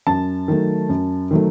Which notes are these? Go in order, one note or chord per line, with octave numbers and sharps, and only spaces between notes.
F#2 A5
D#3 F#3 A3
F#2
D#3 F#3 A3